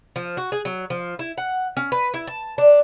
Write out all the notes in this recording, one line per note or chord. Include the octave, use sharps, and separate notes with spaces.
F3
F#4
G#4
F#3
F3
E4
F#5
C#4
B4
E4
A5
D4